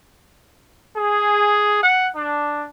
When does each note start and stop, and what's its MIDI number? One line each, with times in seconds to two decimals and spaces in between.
0.95 1.82 68
1.83 2.07 78
2.14 2.66 62